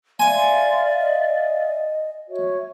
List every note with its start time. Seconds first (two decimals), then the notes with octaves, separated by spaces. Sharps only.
0.20 D5 E5 F5 G#5 C6
1.00 D#5
2.28 F#4 C#5 E5